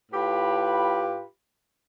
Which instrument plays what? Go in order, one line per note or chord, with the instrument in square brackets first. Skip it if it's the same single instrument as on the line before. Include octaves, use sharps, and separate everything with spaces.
[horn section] A2 F4 G4 B4 B5